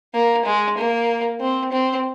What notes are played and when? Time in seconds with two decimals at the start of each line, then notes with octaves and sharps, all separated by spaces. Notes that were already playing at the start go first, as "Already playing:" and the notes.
0.14 A#3
0.45 G#3
0.78 A#3
1.41 C4
1.72 C4